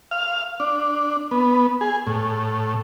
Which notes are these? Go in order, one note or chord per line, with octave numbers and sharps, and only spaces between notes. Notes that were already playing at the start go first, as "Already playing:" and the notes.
F5
D4
B3
G#4
A2